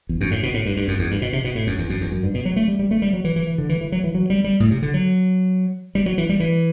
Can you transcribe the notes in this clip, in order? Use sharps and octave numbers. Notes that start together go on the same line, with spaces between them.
E2
F#2
A2
B2
A2
G2
G2
F#2
E2
G2
B2
C3
B2
A2
F#2
E2
F#2
E2
F#2
G2
B2
F#3
A3
G3
G3
A3
G3
F#3
E3
E3
E3
D3
E3
E3
F#3
E3
F#3
G3
G3
A2
C3
D3
F#3
G3
F#3
E3
G3
E3